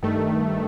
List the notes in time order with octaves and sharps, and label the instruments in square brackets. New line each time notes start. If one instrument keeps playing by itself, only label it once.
[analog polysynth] G2 D#3 A3